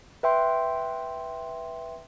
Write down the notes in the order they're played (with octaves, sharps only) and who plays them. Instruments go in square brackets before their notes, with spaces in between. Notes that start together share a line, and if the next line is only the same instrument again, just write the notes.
[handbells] B4 E5 G5 C6